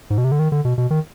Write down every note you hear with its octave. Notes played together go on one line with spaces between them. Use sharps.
G#2
B2
C3
D3
D#3
D3
B2
B2
D#3